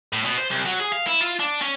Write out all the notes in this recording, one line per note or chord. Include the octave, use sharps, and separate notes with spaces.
A2
B2
C5
C2
F#3
G#4
F5
E4
F4
D4
C#4